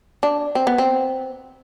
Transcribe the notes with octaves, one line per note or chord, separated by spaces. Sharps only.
D4
C4
B3
C4